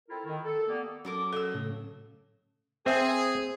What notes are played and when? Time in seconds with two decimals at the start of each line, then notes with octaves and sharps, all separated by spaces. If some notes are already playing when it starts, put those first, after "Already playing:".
0.08 C4 E4 F4 A4 A#4
0.25 D#3
0.44 A4
0.68 G3 A#3 B3
1.05 F#3 C#4 A4 A#4 D6
1.33 A4 D#5 E6
1.54 A2 C#3
2.86 C4 G#4 C5 E5